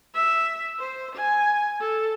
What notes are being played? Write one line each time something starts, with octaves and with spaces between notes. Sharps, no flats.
E5
C5
G#5
A4